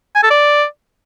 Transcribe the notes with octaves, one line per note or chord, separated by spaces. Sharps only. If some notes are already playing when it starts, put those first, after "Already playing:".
G#5
A4
D5